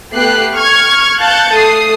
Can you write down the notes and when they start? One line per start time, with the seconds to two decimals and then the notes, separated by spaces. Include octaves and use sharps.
0.14 A3 B3 G4 F#6 C7
0.54 C#6 F6 G#6
1.19 F5 A5 F#6 G6 A6 C#7
1.51 A3 D#6 C7